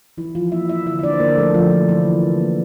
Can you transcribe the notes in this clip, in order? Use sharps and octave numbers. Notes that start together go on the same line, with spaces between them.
E3 E4
E3 F3 F4
A#3 E4 E5
A#3 E4 E5
D3 E4 E5
E5
A#3 D4 D5
C5
D3 A#3 A#4
F3 A3 A4
D3 F3 F4
A3
D3 E3 E4
F3
D3
A#3